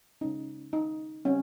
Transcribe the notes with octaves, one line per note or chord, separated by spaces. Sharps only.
C#3 G#3 C#4 D#4
D#4
C#3 G3 C4 C#4